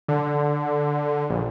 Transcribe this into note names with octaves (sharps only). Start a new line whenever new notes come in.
D3
A#1